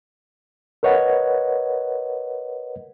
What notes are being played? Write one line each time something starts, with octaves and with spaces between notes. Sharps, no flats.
A#4 B4 C#5 D#5 F#5